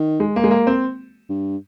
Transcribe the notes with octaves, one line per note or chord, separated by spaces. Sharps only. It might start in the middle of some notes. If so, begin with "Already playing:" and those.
Already playing: D#3
G#3
A#3
G#3
A#3
C4
G2